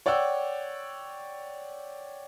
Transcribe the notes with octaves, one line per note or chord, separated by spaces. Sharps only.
C#5 D5 F#5 G5 E6